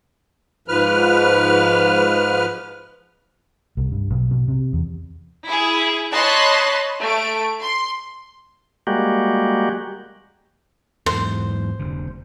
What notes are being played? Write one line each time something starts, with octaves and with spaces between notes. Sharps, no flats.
G#2 F3 B4 F6
C2
G2
B1
B2
C3
E2
E4 G#4
C#5 D#5 A5 B5 C6 F#6
A3 D7
C6
G3 G#3 A#3 F#4 G4
E2 G#2 C5
F1 D3